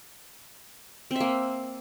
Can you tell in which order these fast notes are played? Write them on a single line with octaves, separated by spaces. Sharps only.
C4 E5 A#3